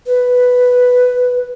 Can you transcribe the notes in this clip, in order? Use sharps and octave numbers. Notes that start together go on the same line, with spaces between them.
B4